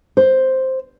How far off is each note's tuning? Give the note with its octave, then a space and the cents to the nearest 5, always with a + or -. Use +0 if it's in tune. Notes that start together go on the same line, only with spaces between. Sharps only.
C5 +5